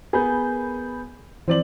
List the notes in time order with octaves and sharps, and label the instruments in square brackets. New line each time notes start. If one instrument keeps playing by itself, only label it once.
[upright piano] B3 G#4 [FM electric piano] A#4 B5 G6
[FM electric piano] E3 F3 [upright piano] C4 D5 F#7